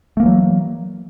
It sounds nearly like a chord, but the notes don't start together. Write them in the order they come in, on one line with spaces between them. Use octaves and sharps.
A3 A#3 E3 F#3